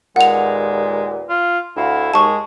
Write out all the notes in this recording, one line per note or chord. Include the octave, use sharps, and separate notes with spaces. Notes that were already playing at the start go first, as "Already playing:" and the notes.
D#2 A#2 G#3 B3 F#5 F7
F4
D2 E4 F#4 F5
D#2 G#3 A5 C#6